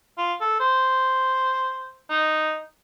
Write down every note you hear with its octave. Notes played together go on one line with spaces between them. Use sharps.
F4
A4
C5
D#4